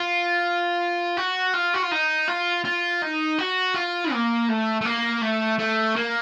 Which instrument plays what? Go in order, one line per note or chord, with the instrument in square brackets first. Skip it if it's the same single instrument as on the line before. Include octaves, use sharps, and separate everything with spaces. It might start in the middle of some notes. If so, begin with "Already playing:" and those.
Already playing: [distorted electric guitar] F4
F#4
F4
F#4
F4
D#4
F4
F4
D#4
F#4
F4
A#3
A3
A3
A#3
A3
A3
A#3